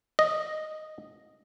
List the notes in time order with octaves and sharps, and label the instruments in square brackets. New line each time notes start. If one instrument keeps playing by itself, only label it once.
[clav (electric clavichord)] D#5